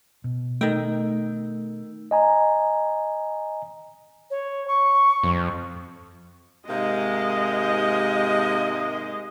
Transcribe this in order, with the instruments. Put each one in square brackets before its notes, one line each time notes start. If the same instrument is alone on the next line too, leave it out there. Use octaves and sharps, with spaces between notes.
[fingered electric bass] B2
[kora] D#3 G5 [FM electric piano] A3
[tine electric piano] D#5 G#5 A#5
[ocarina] C#5
C#6
[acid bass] F2
[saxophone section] G#2 C3 A#3 [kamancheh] G#3 D#5